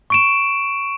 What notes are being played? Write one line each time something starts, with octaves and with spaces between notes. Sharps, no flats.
C#6 D7 E7